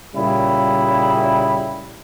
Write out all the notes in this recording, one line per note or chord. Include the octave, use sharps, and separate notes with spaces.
A#2 C#3 G3 E4